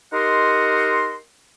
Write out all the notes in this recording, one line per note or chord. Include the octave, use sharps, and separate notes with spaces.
D#4 G4 A#4 D#5 F#5 C6